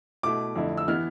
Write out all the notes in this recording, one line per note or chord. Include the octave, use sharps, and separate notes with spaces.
B2 A3 E4 D6
F2 D3 A3 E4
E6
E3 B3 E4 F6